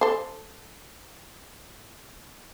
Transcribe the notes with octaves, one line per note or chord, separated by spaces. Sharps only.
A4 C5